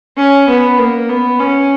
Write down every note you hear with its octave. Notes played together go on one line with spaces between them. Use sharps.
C#4
B3
A#3
B3
C#4